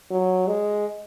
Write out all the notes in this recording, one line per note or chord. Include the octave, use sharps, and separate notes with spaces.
F#3
G#3